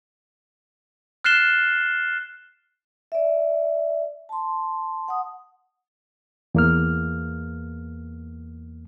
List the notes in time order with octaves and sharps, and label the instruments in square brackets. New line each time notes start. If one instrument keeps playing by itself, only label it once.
[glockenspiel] F6 F#6 A6 C7 E7 G7
[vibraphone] D5 E5
A5 C6
F#5 D#6
[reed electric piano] E2 A#3 F6